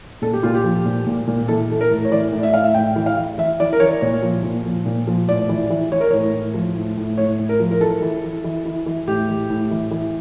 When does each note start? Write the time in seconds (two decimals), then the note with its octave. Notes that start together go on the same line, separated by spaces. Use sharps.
0.22 A#2 A4
0.33 G4
0.43 A#2 F4
0.54 G4
0.64 F3
0.85 A#2
1.06 A#2
1.27 A#2
1.48 E3 A4
1.70 E3 A4
1.81 A#4
1.91 A2
2.05 C#5
2.11 E3 D5
2.32 A2
2.43 E5
2.54 A2 F5
2.64 E5
2.74 A2 G5
2.96 E3
3.06 F5
3.17 E3
3.38 E3 E5
3.60 E3 D5
3.73 A#4
3.80 E3 C#5
4.01 A#2 C#5
4.22 F3
4.43 A#2
4.65 F3
4.85 A#2
5.07 F3
5.28 A2 D5
5.49 E3
5.70 E3
5.92 E3 C#5
6.01 A#4
6.11 A2 C#5
6.34 A2
6.54 F3
6.76 A2
6.97 A2
7.18 A2 C#5
7.39 A2
7.49 A#4
7.60 F3
7.71 A#4
7.80 E3 A4
8.02 E3
8.24 E3
8.44 E3
8.66 E3
8.86 E3
9.07 A2 G4
9.29 E3
9.50 A2
9.71 E3
9.91 E3